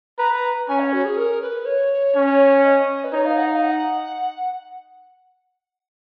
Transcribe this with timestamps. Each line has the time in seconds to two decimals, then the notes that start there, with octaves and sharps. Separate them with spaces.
0.18 B4 A#5
0.35 A#5
0.68 C#4 G#5
0.80 C#5
0.93 F#4
1.05 G#4
1.17 A#4
1.42 B4
1.65 C#5
2.15 C#4
2.64 D#5
3.04 B4
3.13 D#4 C#5
3.25 F5
3.37 F#5
3.50 F5
3.63 F#5